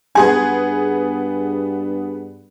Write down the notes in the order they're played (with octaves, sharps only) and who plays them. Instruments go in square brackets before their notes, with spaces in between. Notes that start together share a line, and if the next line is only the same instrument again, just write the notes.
[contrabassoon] G2 [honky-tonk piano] B3 G#4 G#6 [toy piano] G#5 C6